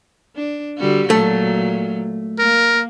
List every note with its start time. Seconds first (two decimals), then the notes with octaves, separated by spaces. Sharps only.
0.36 D4
0.77 D3 G3 F#4
1.10 A#2 F#3 A3
2.39 A#3 A#4